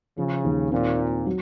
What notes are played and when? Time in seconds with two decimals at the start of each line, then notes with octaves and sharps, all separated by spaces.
0.18 C#3 F3
0.45 D#2
0.72 A#2 C4
0.99 F4
1.27 F#3